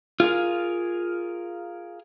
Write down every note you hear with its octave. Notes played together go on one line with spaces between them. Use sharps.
F4 G#4 A#4 F5